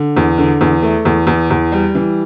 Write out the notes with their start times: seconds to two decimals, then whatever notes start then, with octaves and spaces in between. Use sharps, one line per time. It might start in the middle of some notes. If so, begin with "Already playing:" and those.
Already playing: D3
0.17 E2
0.38 D3
0.61 E2
0.82 A3
1.05 E2
1.27 E2
1.50 E2
1.72 G3
1.95 E3